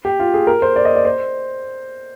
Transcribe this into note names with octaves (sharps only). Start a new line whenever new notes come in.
G4
F4
G#4
A#4
C5
D5
D#5
D5
C5